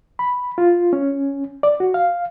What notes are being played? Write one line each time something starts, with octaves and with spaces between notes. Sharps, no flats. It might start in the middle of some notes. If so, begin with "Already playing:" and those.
B5
F4
C#4
D5
F#4
F5